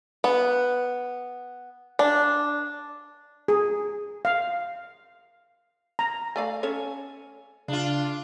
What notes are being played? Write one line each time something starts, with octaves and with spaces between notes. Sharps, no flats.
B3
D4
G#4
F5
A#5
A3 D5 F5 G#5
C#4 A4 C#5
C#3 D4 F4